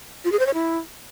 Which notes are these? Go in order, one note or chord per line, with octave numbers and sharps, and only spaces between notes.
F4
G#4
C5
C#5
E4